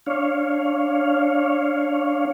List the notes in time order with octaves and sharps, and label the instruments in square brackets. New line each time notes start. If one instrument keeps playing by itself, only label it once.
[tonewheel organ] D4 C#5 F5